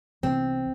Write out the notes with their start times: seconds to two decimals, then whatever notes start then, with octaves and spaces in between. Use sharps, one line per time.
0.23 C2 C3 E3 B3 C4